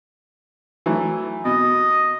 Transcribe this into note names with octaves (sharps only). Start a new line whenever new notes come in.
E3 F#3 A3
B2 D#5